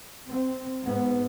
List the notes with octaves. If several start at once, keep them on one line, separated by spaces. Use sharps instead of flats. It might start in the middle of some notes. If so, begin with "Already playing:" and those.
C4
G#2 B3